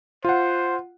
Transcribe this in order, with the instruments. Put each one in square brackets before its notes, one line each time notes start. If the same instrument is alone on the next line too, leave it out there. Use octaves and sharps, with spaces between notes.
[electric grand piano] F4 F#5 [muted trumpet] C5